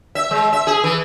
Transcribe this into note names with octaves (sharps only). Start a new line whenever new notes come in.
E5
G#3
E5
G#4
E3